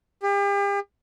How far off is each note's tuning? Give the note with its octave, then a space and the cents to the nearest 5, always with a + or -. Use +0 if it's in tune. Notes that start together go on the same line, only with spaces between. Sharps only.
G4 +40